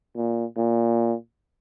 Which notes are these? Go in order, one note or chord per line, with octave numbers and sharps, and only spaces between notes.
A#2
A#2